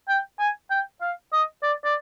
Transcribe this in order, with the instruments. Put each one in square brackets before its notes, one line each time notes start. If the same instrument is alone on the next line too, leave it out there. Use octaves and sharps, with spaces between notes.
[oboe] G5
G#5
G5
F5
D#5
D5
D5